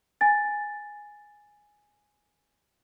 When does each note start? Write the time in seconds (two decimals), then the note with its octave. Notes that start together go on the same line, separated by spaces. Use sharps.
0.21 G#5 A6